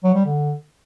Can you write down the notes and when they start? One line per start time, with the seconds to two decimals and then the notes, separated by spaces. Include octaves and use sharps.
0.04 F#3
0.15 G3
0.26 D3